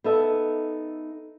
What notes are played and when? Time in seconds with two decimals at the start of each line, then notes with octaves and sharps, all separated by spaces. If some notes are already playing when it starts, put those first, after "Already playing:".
0.04 B3 D#4 A4 E5